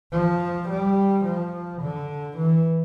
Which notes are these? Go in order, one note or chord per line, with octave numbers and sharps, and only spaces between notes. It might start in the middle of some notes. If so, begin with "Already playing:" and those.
F3
G3
F3
D3
E3